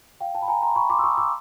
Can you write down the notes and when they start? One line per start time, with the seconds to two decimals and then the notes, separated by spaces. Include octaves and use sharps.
0.20 F5 G5
0.35 G5 A5
0.42 B5
0.48 G#5 A#5
0.62 A#5 C6
0.76 B5 C#6
0.90 C6 D6
0.99 E6
1.03 C#6 D#6
1.17 D6 E6